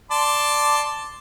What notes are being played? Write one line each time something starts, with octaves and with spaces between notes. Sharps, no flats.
D5 A5 C6